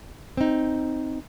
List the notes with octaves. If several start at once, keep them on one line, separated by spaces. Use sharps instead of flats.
C4 D#4